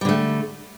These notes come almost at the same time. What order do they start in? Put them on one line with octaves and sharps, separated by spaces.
G3 D3 A3